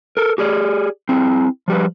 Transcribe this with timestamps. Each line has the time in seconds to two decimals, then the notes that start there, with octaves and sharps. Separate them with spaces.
0.17 A4 A#4
0.38 G4 G#4 D5
1.09 C4 E4 G#4
1.68 F3 G3 B4